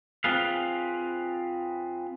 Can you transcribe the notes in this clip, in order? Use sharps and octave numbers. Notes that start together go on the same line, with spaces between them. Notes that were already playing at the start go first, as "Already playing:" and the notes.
C4 F4 G#4 B4 F5